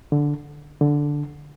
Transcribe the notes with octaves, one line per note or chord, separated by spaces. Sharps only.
D3
D3